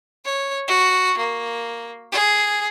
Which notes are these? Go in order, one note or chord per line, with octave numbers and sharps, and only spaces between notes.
C#5
F#4
A#3
G#4